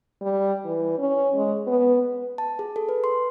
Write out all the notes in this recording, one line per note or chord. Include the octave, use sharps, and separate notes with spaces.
G3
E3
C#4
G#3
B3
A5
G#4
A4
B4
C6